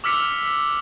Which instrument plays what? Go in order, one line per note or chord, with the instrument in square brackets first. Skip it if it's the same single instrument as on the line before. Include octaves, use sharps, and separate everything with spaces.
[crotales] D6 E6 F6 B6 C#7 F7